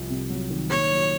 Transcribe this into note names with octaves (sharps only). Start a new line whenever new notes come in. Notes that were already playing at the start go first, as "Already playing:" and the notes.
Already playing: C2 F3
C3
F#3
D#3
A#2 C#5
F#3